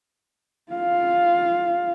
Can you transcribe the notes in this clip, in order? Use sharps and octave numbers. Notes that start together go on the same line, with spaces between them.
F4 F5